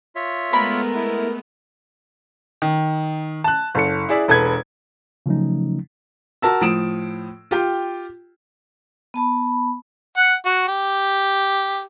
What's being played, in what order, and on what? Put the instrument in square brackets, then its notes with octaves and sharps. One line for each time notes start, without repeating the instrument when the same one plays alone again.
[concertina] F4 C#5 E5
[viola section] G#3 A3 B3 [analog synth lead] A#4 [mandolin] B5
[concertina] E4
[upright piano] D#3
A5 F#6
F#1 A4 C#7
E4 G#4 D5 E5
E1 A4 B4 G#6
[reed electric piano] C#3 F3 F#3 A3 C#4 D#4
[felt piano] F#4 A#4 A5 E6
A2 F3 D#6 D7 E7
F4 G4 G5
[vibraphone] B3 A5 B5
[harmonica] F#5
F#4
G4